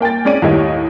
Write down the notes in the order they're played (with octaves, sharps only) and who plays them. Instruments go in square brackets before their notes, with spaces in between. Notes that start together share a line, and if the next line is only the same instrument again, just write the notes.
[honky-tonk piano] A#3 G5 G#5 A6
G#3 C#4 D5 D7 D#7
D#2 A2 D#4 G4 C#5 D#5